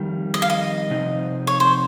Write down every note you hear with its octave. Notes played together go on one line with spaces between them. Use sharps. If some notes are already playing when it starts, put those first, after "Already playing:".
Already playing: F2 D#3 G3
D#5
F5
D#5
C3 F3 C4 D#4
C#5
C5